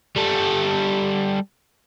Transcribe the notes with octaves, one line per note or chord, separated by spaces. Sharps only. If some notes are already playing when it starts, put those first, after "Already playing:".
G3 A4